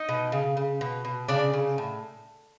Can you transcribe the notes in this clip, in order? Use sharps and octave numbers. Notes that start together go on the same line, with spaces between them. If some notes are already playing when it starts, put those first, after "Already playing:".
Already playing: D#4 D#5
B2
C#3
C#3
B2
B2
C#3 D4 D5
C#3
A2